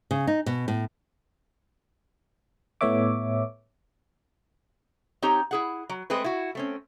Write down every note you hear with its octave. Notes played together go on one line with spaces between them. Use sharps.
C#3
D#4
B2
A2
A2 A3 B3 C#5 E5 D6
C4 D#4 G4 C#5 A#5
E4 G#4 F#5
F#3
G#3 A3 C4 G#4 B4
E4 F#4
A3 C4 C#4